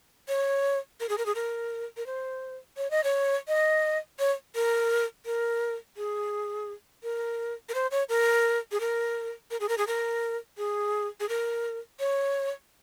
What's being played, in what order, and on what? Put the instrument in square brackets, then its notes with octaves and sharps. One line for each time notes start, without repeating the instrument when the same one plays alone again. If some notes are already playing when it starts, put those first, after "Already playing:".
[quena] C#5
A#4
G#4
A#4
G#4
A#4
A#4
C5
C#5
D#5
C#5
D#5
C#5
A#4
A#4
G#4
A#4
A#4
C5
C#5
A#4
G#4
A#4
A#4
G#4
A#4
G#4
A#4
G#4
G#4
A#4
C#5